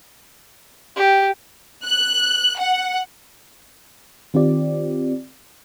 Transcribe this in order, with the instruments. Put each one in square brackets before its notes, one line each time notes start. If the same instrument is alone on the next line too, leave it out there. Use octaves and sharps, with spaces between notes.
[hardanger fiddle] G4
[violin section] F#6
F#5
[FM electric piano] D#3 C4 F4 G4 D5